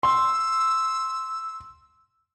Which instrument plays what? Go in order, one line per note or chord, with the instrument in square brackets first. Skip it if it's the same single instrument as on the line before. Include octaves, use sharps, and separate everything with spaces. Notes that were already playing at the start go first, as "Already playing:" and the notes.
[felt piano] C6 [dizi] E6